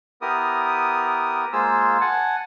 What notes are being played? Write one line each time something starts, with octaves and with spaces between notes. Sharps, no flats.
B3 E4 G4 A#4 D#6
G#3 A#3 F4 G#4 C5 E6
F#5 G#5 A5